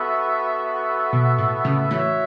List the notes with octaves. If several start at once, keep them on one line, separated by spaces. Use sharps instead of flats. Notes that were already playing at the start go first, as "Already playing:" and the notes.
Already playing: B3 F#4 A4 E5
B2
A2
A2 C#3
E3 A3 F#4 C#5 E5